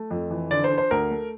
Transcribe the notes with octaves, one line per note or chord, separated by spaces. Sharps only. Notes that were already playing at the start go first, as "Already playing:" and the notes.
Already playing: A3
F2
E3
D3 D5
C5
D4
C5
D2 A#4
A3